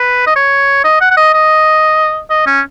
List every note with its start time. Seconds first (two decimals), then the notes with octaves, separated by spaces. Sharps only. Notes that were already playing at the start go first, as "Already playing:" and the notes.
Already playing: B4
0.27 D#5
0.36 C#5
0.84 D#5
1.01 F#5
1.11 F#5
1.17 D#5
1.34 D#5
2.30 D#5
2.47 C#4